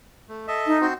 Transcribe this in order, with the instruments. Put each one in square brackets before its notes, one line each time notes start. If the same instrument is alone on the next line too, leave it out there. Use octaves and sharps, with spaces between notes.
[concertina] A3
A4 D#5 E5
[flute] D#4
[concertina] C4 F#4 C5